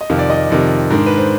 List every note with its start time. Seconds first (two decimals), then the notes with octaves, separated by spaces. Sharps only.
0.01 D#5
0.10 F2 C3 D#3 F5
0.19 D5
0.30 D#5
0.50 F2 C3 D#3
0.90 G#2 D#3 G#3 D4
1.06 B4
1.18 C5